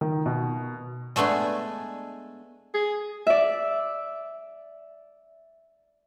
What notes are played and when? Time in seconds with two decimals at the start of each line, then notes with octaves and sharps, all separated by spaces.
0.01 D#3
0.26 B2
1.16 G#3 A3 B3 D4 G#4
2.74 G#4
3.27 D5 E5